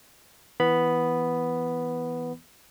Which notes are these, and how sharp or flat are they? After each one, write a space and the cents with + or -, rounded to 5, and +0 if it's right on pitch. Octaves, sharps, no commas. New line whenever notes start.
E3 +0 B3 +0 B5 +0